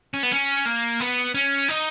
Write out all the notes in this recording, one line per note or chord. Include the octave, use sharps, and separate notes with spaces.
C#4
B3
C#4
A#3
B3
C#4
D#4